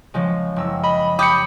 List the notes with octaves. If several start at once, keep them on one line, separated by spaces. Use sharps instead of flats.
C#3 F3 G#3
F#1 E6
D#5 B5
G4 D#6 G6 C#7